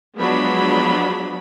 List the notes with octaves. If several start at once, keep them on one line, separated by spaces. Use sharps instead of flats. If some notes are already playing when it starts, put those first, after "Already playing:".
F3 F#3 G#3 B3 D4 B5